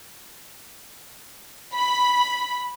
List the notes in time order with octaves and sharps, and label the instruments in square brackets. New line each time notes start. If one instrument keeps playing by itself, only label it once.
[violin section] B5